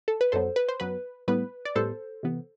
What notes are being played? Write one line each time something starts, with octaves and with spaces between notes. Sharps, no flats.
A4
B4
F#2 F#3 B3 A4 C5
B4
C5
F#2 F#3 B3 B4
A2 G3 B3 B4
D5
A2 G3 B3 A4 C5
C3 E3 B3